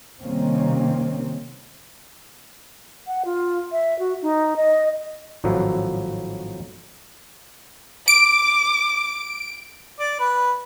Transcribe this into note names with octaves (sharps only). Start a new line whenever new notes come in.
C3 D#3 G3 A#3 C4 C#4
F#5
F4
E5
F#4
D#4
D#5
G#1 A2 F3 F#3 B4 E5
D6 D7
D5
B4